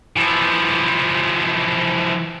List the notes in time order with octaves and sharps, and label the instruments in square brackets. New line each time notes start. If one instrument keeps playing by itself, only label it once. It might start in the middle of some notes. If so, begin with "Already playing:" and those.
[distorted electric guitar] E3 F3